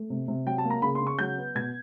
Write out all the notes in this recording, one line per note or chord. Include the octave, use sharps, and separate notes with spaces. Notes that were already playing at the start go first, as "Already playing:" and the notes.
Already playing: A3
C3
C3
F#3 G5
A5
A#3
A#5
C#3 B5
C6
C#3
C#6
F#3 G6
B3
B2 G#6